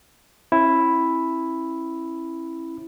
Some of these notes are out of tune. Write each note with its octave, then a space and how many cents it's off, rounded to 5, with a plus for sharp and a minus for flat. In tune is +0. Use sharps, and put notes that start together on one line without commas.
C#4 -45 E4 +0